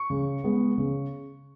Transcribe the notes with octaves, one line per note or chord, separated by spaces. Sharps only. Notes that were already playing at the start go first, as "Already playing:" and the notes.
Already playing: C#6
C#3
G#3 B3
C#3